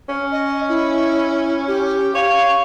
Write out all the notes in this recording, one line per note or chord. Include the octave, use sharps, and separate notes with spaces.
C#4
D#5
E4
G4
C#5 F5